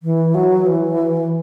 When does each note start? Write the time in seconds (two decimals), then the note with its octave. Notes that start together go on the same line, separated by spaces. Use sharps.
0.03 E3
0.35 F#3
0.67 E3